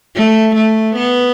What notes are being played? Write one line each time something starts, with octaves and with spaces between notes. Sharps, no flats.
A3
A3
B3